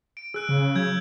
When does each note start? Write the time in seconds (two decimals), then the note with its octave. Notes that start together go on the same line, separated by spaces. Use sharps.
0.17 D7
0.34 G#4 E6 F#6 D7
0.49 C#3
0.75 F#3 E6 G6 G#6